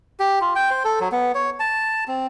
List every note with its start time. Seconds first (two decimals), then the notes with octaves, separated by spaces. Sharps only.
0.20 G4
0.41 F4
0.56 G5
0.70 C5
0.85 A4
1.01 F#3
1.12 B3
1.35 C#5
1.60 A5
2.08 C4